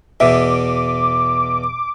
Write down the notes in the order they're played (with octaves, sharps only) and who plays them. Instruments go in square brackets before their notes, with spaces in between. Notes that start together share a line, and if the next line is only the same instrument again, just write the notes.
[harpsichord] E2 B2 [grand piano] E5 [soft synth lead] D6